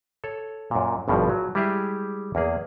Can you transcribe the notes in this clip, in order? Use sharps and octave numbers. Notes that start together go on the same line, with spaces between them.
A4 C#5
F#2 A#2
G#1 G2 B2 F3
F#3
G3 G#3 E4 G4 G#4 E5
E2 A#3 G#4